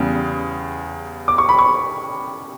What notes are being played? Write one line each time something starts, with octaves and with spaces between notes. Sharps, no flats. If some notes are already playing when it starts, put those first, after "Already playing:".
Already playing: E2 C#3 G3
D6
C#6
B5
C#6